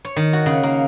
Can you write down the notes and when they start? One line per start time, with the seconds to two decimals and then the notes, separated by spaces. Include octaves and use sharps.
0.05 C#5
0.16 D#3
0.33 F#4
0.46 C#3
0.63 A#3